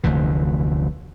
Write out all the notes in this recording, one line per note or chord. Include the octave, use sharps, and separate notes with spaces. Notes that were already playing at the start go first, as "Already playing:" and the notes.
F1 D2 D3 E3